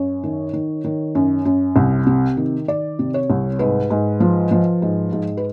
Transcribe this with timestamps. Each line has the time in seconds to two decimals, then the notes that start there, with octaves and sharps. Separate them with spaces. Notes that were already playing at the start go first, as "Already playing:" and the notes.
Already playing: F#2 C#5
0.23 D#3
0.53 D#3
0.84 D#3
1.15 F#2
1.45 F#2
1.76 C2
2.07 C3
2.37 D#3
2.68 D#3 D5
2.99 C3
3.14 C#5
3.30 C2
3.59 G#2 B4
3.90 G#2
4.20 F3
4.51 F3
4.82 G#2
5.13 G#2
5.37 B4